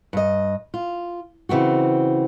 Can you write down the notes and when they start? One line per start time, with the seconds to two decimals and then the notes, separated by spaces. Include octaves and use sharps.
0.13 G2 D#5
0.74 F4
1.49 C#3 E3 C4 F#4